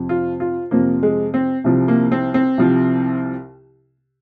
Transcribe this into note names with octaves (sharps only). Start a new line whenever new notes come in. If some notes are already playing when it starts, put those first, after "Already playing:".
Already playing: F2 C3 F3
F4
F4
F2 C3 F3 A#3
G#3
C4
C2 C3 F3
A#3
C4
C4
C2 C3 F3